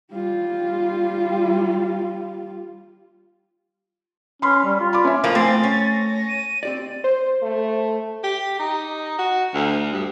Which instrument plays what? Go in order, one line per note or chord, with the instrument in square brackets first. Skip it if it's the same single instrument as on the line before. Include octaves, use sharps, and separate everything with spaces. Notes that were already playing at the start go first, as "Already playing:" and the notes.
[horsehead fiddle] G3 F4
[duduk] C#4 [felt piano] B5 C6
[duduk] G3
F4
[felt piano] B5 D6
C#4 E5
[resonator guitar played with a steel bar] A2 F3 A#3
[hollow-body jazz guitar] A3 F5 G#5 [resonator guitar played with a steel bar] C4 [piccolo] A6
[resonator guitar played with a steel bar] C#4
[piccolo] A#6
D#7
[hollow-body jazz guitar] C4 G4 D5
[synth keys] C5
[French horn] A3
[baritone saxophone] G4
D#4
F#4
D2
G2